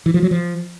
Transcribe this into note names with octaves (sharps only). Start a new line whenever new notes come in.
E3
F3
F#3
F3